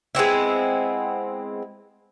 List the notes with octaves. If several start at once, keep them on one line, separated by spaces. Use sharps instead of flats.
G#3 B3 C4 E4